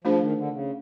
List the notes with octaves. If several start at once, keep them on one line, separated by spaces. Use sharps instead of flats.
F3 A3 D4 F4 G#4 C5
D#3
D3
C#3